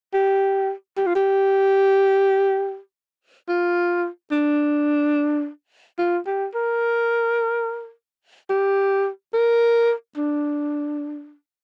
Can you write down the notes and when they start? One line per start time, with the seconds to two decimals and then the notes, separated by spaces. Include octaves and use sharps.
0.14 G4
0.97 G4
1.07 F4
1.15 G4
3.48 F4
4.31 D4
5.98 F4
6.26 G4
6.55 A#4
8.50 G4
9.33 A#4
10.17 D4